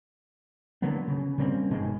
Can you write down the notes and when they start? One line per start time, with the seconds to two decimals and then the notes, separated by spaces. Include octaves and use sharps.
0.82 D3 F#3 A#3 B3
1.08 C#3
1.38 C#3 G3 A#3 C4
1.70 G1 B2 D#3 G#3